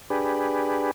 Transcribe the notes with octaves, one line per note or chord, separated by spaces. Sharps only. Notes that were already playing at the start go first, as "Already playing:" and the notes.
D4 G4 G#4 B4